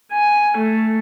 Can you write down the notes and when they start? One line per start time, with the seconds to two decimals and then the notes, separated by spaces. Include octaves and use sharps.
0.12 G#5
0.57 A3